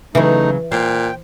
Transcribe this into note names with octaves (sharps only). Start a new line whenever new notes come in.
C#3 E3 F#3 A3 D#4
A#2 C5 G5